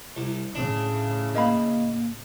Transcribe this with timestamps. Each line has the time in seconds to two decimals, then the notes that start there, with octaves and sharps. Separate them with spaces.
0.17 C2
0.55 A2 C#3 D4
1.35 A#3 D#5 F5 B5